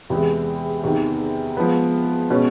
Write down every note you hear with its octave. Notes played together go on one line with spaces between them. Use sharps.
E2 C3 E3 G#3
E2 C3 D#3
F3 G#3 B3
B2 G#3 C#4